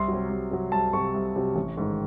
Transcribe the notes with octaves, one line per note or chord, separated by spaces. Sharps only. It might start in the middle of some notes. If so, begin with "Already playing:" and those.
Already playing: C2 C6
C3 F#3
C2
C3 F#3
C2 A5
C3 F#3 C#6
C2
C3 F#3
A1
G#2 D#3